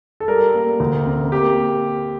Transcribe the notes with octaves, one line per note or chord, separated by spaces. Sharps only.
A4
G3 A#4
A#3
D2
C4
A#3 G4